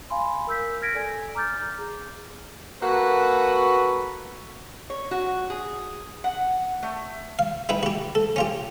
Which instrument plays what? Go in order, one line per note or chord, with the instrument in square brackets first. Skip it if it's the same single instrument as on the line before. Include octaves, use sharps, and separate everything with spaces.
[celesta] F5 G#5 B5 C6
A#4 E6 G6 B6
F6 G#6 A#6 B6 D7
A4 D5 G#5
A#5 D6 F6 G6 A6
G#4
[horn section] A#3 F#4 A4 B4
[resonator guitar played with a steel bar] C#5
F#4
G#4
F#5
A3
[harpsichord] F5
D#4 E4 B4 G5
F#4 G4
A4
C#4 F4 G4